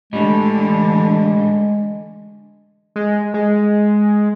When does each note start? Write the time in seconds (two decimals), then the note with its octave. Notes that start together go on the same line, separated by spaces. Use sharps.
0.13 A2 D3 E3 G3 G#3
2.96 G#3
3.34 G#3